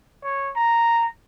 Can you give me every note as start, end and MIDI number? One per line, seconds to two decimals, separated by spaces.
0.23 0.50 73
0.56 1.06 82